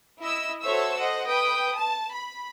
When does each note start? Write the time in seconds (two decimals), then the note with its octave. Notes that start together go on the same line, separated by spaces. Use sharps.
0.21 E4 D#5 E6
0.62 F#4 A4 C5 C#5 E5 E6
0.98 C5 D#5 F#5
1.27 B4 G5 D#6
1.77 A5
2.13 B5